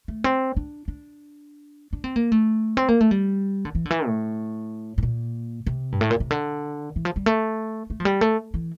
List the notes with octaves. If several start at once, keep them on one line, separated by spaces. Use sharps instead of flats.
A3
C4
D4
D4
D4
C4
A#3
A3
C4
A#3
A3
G3
D3
E3
D3
E3
A2
A2
A#2
C3
G2
A2
A#2
C3
D3
E3
F3
G3
A3
A3
F3
G3
A3
E3